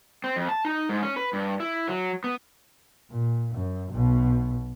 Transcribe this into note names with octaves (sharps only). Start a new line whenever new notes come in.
C4
F2
A5
D#4
G#2
C#4
B4
G2
E4
F#3
B3
A#2
F#2
B1 B2